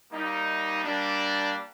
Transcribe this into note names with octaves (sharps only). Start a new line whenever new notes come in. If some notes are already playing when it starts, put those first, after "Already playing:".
G3 A#3 D#4
G3 A#3 D4